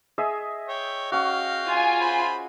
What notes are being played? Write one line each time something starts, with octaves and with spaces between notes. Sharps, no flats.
G#4 D#5 E5
C#5 G5
C#4 F#4 F5 G5
F4 G#5
C5 B5